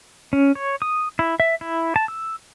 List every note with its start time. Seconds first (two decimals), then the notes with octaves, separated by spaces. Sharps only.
0.33 C#4
0.55 C#5
0.82 D#6
1.19 E4
1.40 E5
1.61 E4
1.96 A5
2.08 E6